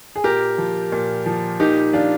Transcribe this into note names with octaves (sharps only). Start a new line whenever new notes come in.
G#4
A#2 G4 A#4
F3
A#2
F3
A#2 D#4 G4
F3 D4 F4